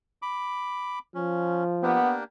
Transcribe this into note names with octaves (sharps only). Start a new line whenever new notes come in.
B5 D6
F3 C#4
A#3 B3 D4 G4